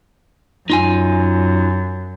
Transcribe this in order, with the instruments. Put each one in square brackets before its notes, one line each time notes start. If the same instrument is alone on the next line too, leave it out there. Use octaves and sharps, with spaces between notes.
[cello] F#2 [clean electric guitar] D#4 F4 G#5